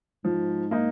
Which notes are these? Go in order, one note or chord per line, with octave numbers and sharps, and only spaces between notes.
G#2 F3
A#3 D#4